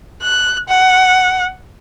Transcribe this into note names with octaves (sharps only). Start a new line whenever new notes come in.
F#6
F#5